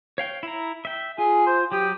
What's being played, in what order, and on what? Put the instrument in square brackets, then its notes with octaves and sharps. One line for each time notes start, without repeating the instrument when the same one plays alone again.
[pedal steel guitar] C#5 F5 G5
E4 A#5
E5 G5
[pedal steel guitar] F4 [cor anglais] G#4
[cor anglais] C5
[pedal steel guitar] F#3 D#6 [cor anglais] G4